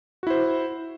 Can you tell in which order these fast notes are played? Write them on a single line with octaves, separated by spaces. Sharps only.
F#4 E4 C5